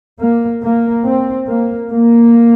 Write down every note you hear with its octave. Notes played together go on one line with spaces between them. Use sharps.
A#3
A#3
C4
A#3
A#3